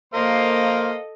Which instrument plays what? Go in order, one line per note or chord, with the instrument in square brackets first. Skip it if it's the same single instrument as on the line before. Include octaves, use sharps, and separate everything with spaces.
[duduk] A#3 [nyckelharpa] A4 D#5 [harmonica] A#4 C5 F5